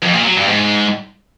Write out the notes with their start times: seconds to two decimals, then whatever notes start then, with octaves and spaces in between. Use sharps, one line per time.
0.02 F2
0.14 A#2
0.25 F#3
0.36 G2
0.48 G#2